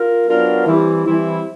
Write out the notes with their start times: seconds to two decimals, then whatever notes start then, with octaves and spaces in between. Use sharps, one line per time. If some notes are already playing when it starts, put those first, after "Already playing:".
Already playing: F4 A#4
0.27 F#3 B3 D4 F4 A#4
0.66 E3 G3 C4 E4
1.06 E3 G3 C4 E4